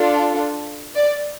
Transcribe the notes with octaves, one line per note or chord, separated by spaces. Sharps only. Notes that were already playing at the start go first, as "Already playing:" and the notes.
Already playing: D4 F4 A4
D5